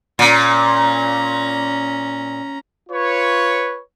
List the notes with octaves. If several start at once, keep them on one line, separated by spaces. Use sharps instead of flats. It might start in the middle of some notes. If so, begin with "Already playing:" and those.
A#2 C#4 A#5
F4 B4 C#5